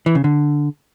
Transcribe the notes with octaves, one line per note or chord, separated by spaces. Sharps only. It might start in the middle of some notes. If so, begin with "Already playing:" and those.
E3
C#3
D3